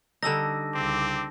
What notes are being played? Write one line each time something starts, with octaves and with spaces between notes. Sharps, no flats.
D3 G3 D#4 A5 E6 A#6
C2 C#3 C4 D6